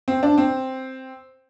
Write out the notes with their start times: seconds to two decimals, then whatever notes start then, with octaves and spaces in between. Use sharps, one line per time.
0.08 C4
0.23 D4
0.38 C4